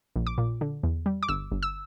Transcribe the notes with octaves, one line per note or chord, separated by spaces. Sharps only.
A#1
D6
A#2
D3
E2
G3
D6
G1 E6
G1
E6